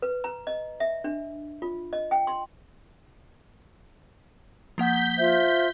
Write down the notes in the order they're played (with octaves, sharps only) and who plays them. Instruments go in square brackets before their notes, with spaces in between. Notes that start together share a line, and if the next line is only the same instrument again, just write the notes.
[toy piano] B4
A#5
D#5
E5
D4
F4
D#5
G5
C6
[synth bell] F3 A#3 F#5 [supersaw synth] G6 B6
[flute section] F4 C5 E5